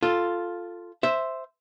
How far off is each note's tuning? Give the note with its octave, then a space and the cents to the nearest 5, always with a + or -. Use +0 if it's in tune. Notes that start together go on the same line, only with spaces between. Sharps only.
F4 +0 A4 +0
C5 +0 E5 +0